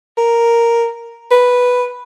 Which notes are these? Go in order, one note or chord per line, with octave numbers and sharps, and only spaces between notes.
A#4
B4